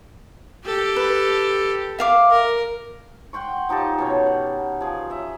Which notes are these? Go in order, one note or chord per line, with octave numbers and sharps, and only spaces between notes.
G4 A4
B4
E5 F5 D6
A#4
F#5 G5 C6 C#6
F3 D#4 G4 A5
B2 C#4 C#5
F#5
F3 G#4
D#5 E5